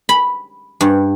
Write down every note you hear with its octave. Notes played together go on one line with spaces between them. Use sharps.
B5
G2